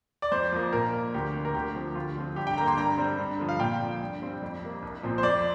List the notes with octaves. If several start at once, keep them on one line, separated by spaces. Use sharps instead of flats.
D5
F2 C5
F3 A#3
A#2 A#4
A#3
D2 G4
C3 A#3
A#4
D2 G4
C3 F3 C4
D2 F4
D3 F3 C4
G2 G4
G5
D3 A#3 A#5
C6
G2 A#5
G3 C4
G2
D3 F3
F5
A#2 G5
F3 C4
G2
G3 C4
F2
C3 A#3
C2
A#2 F3 C4
C5
F2 D5